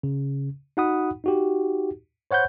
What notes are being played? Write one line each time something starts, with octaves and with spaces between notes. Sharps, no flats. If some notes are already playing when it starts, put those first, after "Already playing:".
C#3
D#4 F#4 F#5 B5 D#6
D#4 F#4 G4
C5 C#5 F#5 B5 G6